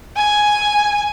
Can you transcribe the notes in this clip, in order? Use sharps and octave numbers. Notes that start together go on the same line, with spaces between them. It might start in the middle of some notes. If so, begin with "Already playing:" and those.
G#5